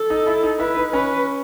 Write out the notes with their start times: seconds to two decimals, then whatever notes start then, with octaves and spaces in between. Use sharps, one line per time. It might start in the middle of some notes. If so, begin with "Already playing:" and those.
Already playing: A4
0.10 D#4
0.27 E4
0.43 D#4
0.60 E4 B4
0.77 D#4
0.93 C#4 B4